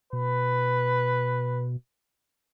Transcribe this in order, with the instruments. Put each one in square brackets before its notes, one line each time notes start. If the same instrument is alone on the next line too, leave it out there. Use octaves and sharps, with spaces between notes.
[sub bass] B2 [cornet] B4